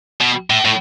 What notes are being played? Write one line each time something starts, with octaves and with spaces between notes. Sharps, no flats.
B2
A2
A2